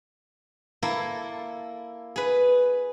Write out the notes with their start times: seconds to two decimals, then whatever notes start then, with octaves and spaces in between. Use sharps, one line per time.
0.83 A#3 E4 A4
2.16 G#4 B4